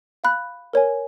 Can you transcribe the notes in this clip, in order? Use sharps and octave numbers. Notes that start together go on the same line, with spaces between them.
F5 B5 F#6
A#4 C#5 G#5